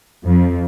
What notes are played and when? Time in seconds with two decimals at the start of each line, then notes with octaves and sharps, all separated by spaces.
0.25 F2